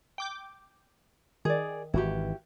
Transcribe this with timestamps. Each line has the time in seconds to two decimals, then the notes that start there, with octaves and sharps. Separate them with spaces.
0.18 G5 D6 G6
1.45 D#3 G#4 D5
1.94 G#1 E3 E4 F#4 G4